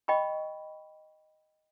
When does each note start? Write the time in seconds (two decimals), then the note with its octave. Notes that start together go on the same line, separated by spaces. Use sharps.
0.08 D#5 G5 B5 C#6